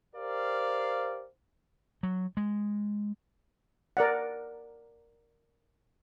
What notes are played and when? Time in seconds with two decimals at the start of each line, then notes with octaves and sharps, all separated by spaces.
0.16 G4 A#4 C5 D5 F5
2.03 F#3
2.37 G#3
3.97 A#4 D5 F#5